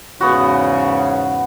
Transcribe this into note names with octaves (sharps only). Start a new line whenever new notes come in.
E2 G#2 C#3 B3 F#4